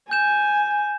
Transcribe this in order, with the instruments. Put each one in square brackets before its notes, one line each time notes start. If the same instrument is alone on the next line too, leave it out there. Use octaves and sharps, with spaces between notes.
[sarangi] G#5 [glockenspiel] G6 E7